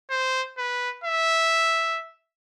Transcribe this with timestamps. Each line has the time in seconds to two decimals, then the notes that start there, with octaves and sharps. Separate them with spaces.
0.11 C5
0.58 B4
1.04 E5